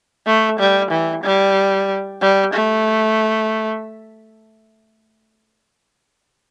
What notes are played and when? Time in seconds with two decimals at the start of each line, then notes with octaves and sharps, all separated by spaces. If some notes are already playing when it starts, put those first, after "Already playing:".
0.27 A3
0.60 G3
0.91 E3
1.24 G3
2.21 G3
2.54 A3